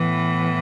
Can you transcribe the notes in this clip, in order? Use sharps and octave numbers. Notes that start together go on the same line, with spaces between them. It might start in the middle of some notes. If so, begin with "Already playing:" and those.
Already playing: A2 E3 B3